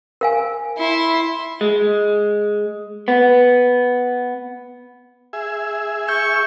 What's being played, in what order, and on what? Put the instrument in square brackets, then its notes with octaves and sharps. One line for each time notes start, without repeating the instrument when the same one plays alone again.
[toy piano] A#4 F5 G#5
[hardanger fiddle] E4 C6
[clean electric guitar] G#3
B3
[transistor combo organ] G#4 E5
[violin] C#6 [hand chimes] G6